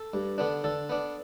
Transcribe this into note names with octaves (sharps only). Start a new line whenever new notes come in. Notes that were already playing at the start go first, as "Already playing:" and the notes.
Already playing: A4
G2
D3 B3 D4
D3 A4
B3 D4